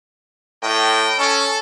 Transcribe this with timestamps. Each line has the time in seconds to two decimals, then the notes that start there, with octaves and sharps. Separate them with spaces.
0.63 A2 D#5 G5
1.19 C#4 A4